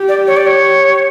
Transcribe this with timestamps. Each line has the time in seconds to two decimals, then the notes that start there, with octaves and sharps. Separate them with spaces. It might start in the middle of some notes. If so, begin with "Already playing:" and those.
Already playing: G4
0.09 D5
0.27 C#5
0.37 D5
0.47 C#5